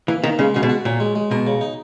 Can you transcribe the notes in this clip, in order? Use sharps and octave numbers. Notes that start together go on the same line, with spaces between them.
E3 A#3
D#3 A#3
C#3 G#3
C#3 F#4
B2
F#4
A#2 C#4
G#3
G#3
B2 A#4
C#3
D#4